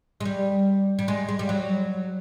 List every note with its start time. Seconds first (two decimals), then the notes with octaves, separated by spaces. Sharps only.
0.20 G#3
0.25 G3
0.99 G3
1.08 G#3
1.29 G#3
1.39 G3
1.49 F#3